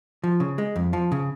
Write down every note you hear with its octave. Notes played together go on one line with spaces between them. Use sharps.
F3
C#3
G#3
F2
F3
C#3